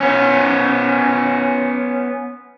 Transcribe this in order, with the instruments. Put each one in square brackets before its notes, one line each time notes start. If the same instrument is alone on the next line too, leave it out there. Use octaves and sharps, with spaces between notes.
[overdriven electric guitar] B3 C#4